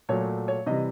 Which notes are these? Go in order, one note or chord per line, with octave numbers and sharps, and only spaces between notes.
A#2 F#3 A3 C#5
C#5
C3 E3 G3 D#5